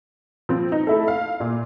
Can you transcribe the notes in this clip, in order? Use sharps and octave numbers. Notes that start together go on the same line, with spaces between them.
F3 C4
D#4
A3 E4 A4
F5
A#2